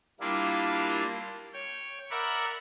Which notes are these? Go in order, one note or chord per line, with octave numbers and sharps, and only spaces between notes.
G3 A#3 D4 E4 F4
C#5 G5
A#4 D5 E5 F#5 B5